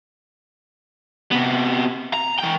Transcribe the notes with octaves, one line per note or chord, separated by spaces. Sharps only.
C3 B3
A#5
E3 G5